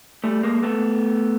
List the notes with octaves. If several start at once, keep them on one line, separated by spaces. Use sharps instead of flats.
G3 A3
G#3 A#3
A3 B3